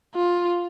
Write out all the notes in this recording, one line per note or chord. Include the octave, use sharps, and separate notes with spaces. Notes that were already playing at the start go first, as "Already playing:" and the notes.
F4